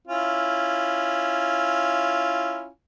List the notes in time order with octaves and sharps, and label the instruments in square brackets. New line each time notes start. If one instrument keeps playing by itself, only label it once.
[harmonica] C#4 E4 F4